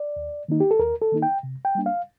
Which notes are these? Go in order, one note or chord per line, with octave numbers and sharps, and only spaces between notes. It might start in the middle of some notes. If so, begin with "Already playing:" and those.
Already playing: D5
D#2
D#3 A#3 D#4
G4
A4
D#2 A#4
A4
D#3 A#3 D#4
G5
C3
G5
G3 A#3 D4
F5